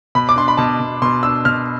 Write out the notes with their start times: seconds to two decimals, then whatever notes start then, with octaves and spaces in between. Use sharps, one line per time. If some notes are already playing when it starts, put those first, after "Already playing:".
0.15 B2 B5
0.29 D6
0.36 D4 C6
0.48 B5
0.57 B2 A5
0.80 B2
1.02 B2 C6
1.23 D4 E6
1.45 B2 F6